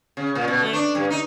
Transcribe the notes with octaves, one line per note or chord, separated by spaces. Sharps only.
C#3
A#2
B2
A3
D4
G2
D#4